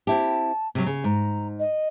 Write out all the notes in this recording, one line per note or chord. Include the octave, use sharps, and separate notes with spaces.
C4 E4 G4 A5
C3 F#3
C#3
G#2 A#5
D#5